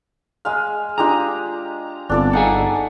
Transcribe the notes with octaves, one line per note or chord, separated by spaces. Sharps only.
G#3 G#4 F5 A#5 F6
G#3 D4 F4 G4 G#4 A#5
G1 B3 C4 D4 F4 A4 D5
D#4 G#4 A4 F5 F#5 G#5